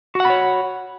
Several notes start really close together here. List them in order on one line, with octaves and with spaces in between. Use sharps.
F#4 F#5 B5 C#5